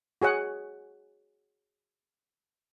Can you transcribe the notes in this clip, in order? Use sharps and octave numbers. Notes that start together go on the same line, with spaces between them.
F#4 G#4 C#5 F#5